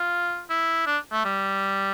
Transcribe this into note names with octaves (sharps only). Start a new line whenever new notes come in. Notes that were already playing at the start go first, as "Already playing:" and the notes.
Already playing: F4
E4
D4
A3
G3